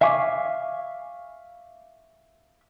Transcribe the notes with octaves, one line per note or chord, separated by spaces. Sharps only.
E5 F5 G#5 C#6 D6